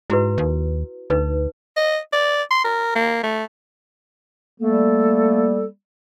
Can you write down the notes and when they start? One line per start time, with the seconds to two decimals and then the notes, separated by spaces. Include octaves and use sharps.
0.10 G#2 E4 F#4 B4
0.38 D#2
1.10 D2 D#4 B4
1.76 D#5
2.13 D5
2.51 C6
2.64 A#4
2.95 A#3
3.23 A3
4.60 G3 A3 A#3 A4